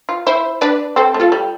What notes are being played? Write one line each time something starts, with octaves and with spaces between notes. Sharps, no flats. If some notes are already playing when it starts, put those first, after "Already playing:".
F4
E4 C5 E5
D4 B4 D5
C4 A4 C5
A3
F4 A4
G3